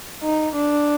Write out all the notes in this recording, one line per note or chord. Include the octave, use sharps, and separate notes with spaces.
D#4
D4